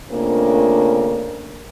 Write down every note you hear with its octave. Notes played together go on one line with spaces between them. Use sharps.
C#3 A3 A#3 C4 D4 F4